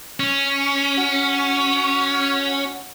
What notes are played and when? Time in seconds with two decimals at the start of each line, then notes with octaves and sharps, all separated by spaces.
0.20 C#4
0.98 F#4